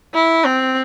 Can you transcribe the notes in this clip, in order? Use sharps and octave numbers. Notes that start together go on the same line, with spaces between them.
E4
C4